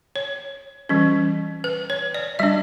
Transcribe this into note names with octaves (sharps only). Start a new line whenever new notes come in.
C#5
E3 G3 C#4
B4
C#5
D5
G3 D4 E5